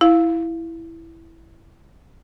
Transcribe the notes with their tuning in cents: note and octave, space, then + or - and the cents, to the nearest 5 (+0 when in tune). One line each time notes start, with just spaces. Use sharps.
E4 +0 F5 +0